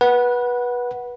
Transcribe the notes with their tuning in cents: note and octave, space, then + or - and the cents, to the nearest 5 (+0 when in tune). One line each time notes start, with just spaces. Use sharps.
B4 -20 F#5 +0